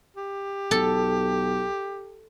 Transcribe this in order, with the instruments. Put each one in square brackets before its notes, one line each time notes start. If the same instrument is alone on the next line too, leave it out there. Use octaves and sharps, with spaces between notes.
[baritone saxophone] G4
[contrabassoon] B1 [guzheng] A4